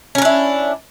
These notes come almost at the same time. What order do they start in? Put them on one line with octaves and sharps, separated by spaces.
C#4 A#4 D4 E4